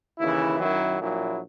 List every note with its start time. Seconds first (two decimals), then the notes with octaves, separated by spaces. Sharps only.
0.19 D#2 C#3 E3 E4
0.59 F#2 D#3 F#3 E4
0.99 A#1 A#2 F#3 E4